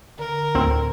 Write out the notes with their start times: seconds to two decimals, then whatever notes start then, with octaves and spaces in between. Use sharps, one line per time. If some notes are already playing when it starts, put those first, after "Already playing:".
0.19 D3 A#4
0.55 D2 A2 C4